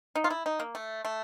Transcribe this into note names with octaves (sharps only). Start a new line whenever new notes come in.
D#4
F4
E4
D#4
A#3
A3
A3